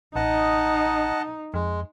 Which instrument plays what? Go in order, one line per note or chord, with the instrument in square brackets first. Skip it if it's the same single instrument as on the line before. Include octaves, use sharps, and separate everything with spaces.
[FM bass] A1 [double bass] D#4 [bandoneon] D#5 F#5 A5
[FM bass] F2 [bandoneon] G#3